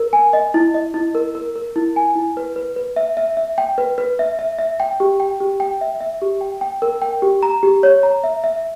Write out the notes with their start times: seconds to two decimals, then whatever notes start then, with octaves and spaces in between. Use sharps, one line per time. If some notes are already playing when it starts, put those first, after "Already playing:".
Already playing: A#4
0.13 G#5
0.33 D#5
0.54 E4
0.74 D#5
0.94 E4
1.15 A#4
1.35 A#4
1.56 A#4
1.76 E4
1.96 G#5
2.15 E4
2.37 B4
2.56 B4
2.76 B4
2.96 E5
3.17 E5
3.37 E5
3.58 G5
3.78 B4
3.98 B4
4.19 E5
4.39 E5
4.58 E5
4.80 G5
5.00 G4
5.20 G5
5.40 G4
5.60 G5
5.81 E5
6.00 E5
6.21 G4
6.41 G5
6.61 G5
6.82 A#4
7.02 G5
7.22 G4
7.43 A#5
7.63 G4
7.83 C#5
8.03 A#5
8.24 E5
8.44 E5